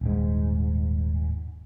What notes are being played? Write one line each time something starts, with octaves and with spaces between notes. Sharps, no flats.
D#1 G#2